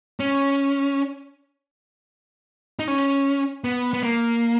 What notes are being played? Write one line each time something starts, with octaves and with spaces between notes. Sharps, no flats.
C#4
D#4
C#4
B3
B3
A#3